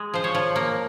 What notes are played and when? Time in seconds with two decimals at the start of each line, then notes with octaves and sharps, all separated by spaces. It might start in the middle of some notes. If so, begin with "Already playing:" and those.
Already playing: G#3
0.14 F3 C5
0.24 C#5
0.35 F3
0.56 A#3